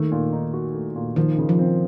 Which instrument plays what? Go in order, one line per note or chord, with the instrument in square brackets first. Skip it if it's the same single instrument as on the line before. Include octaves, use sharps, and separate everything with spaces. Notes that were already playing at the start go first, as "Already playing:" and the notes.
Already playing: [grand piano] D#2 A3 [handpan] D#3
[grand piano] A#2
D#4
F#4
A3
A#2
[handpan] D#3 [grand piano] F3
[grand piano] C#3
[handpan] F3
[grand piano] C4